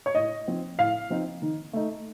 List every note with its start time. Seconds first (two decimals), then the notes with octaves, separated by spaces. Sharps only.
0.06 C#5
0.15 A2 D#5
0.48 F3 C4 D#4
0.79 A2 F5
1.10 F3 C4 D#4
1.42 D#3
1.73 A3 D#4